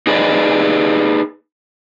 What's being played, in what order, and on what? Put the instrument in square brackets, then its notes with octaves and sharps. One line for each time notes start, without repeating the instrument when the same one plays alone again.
[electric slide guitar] D#4 G#4 B4 D5 D#5